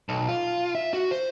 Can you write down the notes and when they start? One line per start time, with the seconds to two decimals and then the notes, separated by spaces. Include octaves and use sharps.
0.09 B1
0.29 F4
0.75 E5
0.94 F#4
1.11 C5